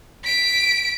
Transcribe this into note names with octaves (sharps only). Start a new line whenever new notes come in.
B6 D7